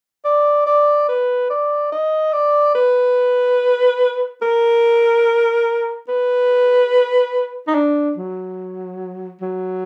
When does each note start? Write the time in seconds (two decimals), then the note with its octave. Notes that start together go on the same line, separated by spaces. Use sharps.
0.25 D5
0.66 D5
1.09 B4
1.50 D5
1.92 D#5
2.33 D5
2.75 B4
4.42 A#4
6.08 B4
7.67 D#4
7.74 D4
8.17 F#3
9.41 F#3